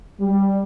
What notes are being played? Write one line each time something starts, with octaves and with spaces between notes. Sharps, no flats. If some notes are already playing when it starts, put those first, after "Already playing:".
G3